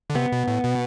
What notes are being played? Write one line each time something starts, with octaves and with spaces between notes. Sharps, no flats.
D3
C3 B3
B2
A2
B2